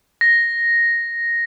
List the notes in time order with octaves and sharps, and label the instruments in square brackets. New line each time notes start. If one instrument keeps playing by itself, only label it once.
[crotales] A#6